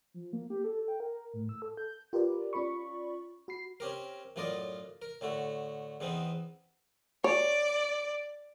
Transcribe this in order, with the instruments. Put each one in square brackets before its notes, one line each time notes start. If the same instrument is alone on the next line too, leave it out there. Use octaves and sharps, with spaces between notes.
[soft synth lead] F3
A#3
G4
A4
G5
A#4
A2
E6
A4
G6
[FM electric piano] F4 G4 A#4 B4 D5
C#4 F4 D5 B5 C#6
F#4 B5 C7
[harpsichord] C4 C#4 G4 A#4
F#2 A2 F4 A#4 D5 D#5
A#4
A2 D3 A3 F#4
E2 E3 B3 C4 D#4
[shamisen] C#5 [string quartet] D5